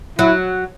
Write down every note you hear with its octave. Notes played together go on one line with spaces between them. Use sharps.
F#3 E4